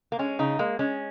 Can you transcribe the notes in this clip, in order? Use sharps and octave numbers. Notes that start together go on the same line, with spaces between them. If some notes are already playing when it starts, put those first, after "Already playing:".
A#3
G#3 C#4
C#3 D#4
G#3 A#3
G#3 C#4